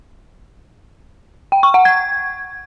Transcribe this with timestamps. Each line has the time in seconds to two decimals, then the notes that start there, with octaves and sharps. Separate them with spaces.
1.52 G5
1.63 C#6
1.74 F#5
1.85 G#6